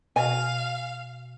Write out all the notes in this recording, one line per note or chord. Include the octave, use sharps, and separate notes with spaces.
B2 F5 G#5